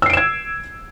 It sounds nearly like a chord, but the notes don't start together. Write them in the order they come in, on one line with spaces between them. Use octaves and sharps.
E6 C7 D7 E7 G#6